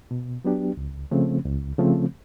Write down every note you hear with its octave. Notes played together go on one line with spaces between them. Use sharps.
B2
F#3 B3 D4 G4
C#2
C#3 F3 A3 C4
C#2
C#3 F3 A3 C4